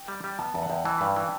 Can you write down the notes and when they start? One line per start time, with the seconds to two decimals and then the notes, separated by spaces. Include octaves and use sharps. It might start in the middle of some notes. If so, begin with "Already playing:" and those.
Already playing: G5
0.08 G3
0.24 G3
0.39 B3 A5
0.54 E2 A5
0.62 F#5
0.70 E2 G5
0.85 E3 A5
0.98 G2 B5
1.09 D5
1.16 E3 G5